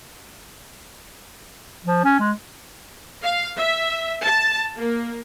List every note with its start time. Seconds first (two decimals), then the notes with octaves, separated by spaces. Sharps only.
1.85 F3
2.04 C#4
2.20 G#3
3.23 F5
3.57 E5
4.23 A5
4.78 A#3